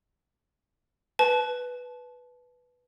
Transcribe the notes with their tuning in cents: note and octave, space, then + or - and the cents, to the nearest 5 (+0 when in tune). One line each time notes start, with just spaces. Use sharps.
B4 +0 A5 -25